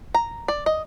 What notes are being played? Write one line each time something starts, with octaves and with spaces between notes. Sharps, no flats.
A#5
D5
D#5